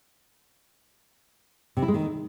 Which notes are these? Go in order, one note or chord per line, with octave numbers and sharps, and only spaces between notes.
C3
E4
G#3
D#3